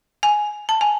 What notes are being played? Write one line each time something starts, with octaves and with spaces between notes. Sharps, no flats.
G#5
A5
G#5